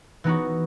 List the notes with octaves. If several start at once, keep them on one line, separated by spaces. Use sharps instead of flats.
E3 B3 D#4 F#4